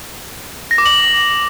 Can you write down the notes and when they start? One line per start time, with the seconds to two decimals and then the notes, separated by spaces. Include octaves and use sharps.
0.71 A#6
0.78 D6
0.86 F#7